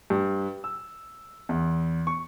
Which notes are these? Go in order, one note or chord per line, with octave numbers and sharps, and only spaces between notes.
G2
E6
E2
C#6